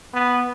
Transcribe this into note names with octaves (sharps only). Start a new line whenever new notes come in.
B3